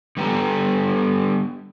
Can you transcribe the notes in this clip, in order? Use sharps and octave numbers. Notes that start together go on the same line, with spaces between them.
D3 G3 B3 G4 A4 A#5